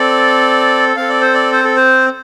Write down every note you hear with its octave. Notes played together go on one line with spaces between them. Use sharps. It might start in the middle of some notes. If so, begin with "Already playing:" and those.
Already playing: C4 A4 D5
C4 A4 F5
D5
C5
D5
C5
A4
C5